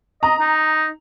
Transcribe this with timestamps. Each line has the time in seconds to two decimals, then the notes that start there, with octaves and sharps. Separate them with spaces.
0.23 D#5 A#5
0.40 D#4